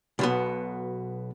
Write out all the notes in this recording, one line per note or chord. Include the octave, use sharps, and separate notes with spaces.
B1 B2 B3